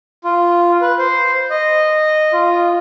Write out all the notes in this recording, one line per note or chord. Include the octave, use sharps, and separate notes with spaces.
F4
B4
C5
D#5
F4